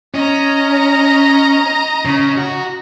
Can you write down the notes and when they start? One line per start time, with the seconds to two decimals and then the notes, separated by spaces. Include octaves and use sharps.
0.14 C#4 D#5 A#5
2.05 C#3
2.38 F#4